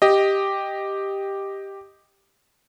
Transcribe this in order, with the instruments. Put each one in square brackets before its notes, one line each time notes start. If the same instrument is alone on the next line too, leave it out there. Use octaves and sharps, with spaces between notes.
[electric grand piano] G4 D#5